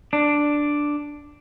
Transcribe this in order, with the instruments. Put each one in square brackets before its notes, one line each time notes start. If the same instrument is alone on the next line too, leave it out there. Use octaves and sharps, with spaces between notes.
[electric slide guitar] D4